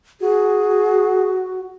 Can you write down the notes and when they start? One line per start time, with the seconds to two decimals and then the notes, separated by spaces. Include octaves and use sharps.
0.21 F#4 G#4